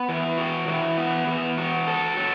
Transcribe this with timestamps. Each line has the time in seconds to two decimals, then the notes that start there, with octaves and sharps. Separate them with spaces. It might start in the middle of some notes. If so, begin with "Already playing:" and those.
Already playing: B3
0.09 E3
0.38 F#4
0.68 E3
0.98 B3
1.27 E3
1.57 F#4
1.87 A4
2.17 F#3